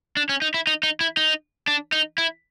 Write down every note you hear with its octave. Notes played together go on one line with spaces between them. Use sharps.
D4
C#4
D#4
E4
D#4
D#4
E4
D#4
D4
D#4
E4